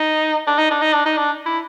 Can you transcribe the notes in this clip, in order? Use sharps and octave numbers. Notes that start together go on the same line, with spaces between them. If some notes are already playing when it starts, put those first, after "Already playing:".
Already playing: D#4
D4
D#4
D4
D#4
D4
D#4
D4
E4